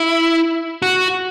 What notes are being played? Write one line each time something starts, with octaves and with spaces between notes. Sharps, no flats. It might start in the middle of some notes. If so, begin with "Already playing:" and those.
Already playing: E4
F#4